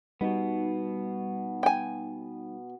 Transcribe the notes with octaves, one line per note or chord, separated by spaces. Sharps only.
B2 G3 B3 D#4
G5 G#5